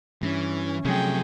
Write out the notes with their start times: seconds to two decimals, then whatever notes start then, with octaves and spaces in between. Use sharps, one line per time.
0.22 G2 E3 C#4
0.85 C3 F3 F#3 A3 G#4 G5